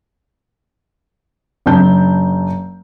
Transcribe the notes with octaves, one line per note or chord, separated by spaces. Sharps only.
F#1 D4 A5 G6